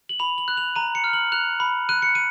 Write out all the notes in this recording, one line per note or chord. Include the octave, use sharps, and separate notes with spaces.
F#7
B5 F7
F#7
F#6
F7
A#5 D#7
C#7
F6
F#7
F#6 F7
B5
F#6 D#7
C#7
D#7